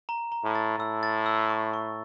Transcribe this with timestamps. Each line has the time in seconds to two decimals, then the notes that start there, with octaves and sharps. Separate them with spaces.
0.09 A#5
0.32 A#5
0.44 A2
0.55 A6
0.79 A2 E6
1.03 A6
1.26 E6
1.50 C#6
1.74 C#6